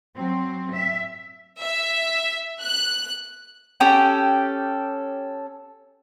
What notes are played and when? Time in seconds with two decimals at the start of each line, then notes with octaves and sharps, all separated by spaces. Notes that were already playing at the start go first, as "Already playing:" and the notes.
0.14 F#3 C4
0.73 E5
1.61 E5
2.62 F#6
3.80 C#4 G4 A4 G5